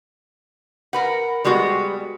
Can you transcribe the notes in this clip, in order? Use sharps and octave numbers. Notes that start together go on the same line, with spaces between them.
A#4 B4 F#5
G3 G#3 B3 F#4